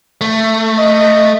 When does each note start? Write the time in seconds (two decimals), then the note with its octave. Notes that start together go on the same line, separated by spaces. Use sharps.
0.21 A3
0.78 D#5